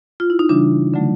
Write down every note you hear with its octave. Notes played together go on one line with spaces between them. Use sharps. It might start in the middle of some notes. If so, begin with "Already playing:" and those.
F4
E4
D#4
C#3 E3 G3 D4
D3 F#3 A3